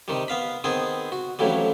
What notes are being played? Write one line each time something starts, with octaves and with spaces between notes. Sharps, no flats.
C3 D#3 G3
B3 F5 B5
D#3 B3 C4 G#4
F#4
A1 F2 A2 F#3 G3